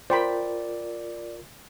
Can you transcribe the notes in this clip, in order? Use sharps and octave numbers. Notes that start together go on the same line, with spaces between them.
F4 A#4 C5 D5 G5 B5